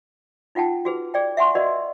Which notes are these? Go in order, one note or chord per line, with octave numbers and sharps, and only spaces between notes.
D#4 F4 F#5 G5 A5
F#4 G#4 B4
G#4 D5 G5
E5 F#5 G#5 C6 C#6
F#4 A#4 B4 D5 D#5 F#5